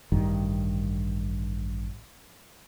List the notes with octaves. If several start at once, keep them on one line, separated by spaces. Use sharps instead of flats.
A1 G2 D#3